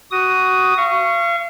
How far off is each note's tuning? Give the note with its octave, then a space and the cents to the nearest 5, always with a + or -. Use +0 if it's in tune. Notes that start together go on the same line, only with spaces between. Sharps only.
F#4 +10 D#6 +0
F5 -35 C#6 +0